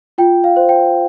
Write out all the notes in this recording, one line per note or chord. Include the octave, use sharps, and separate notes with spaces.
F4 G5
F5
C5
G5